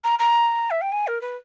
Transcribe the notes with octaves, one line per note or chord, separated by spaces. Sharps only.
A#5
A#5
E5
G5
G#5
A#4
B4